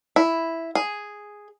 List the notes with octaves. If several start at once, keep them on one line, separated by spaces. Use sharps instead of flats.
E4
G#4